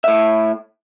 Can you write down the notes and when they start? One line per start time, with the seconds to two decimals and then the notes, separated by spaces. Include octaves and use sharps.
0.04 A2 E5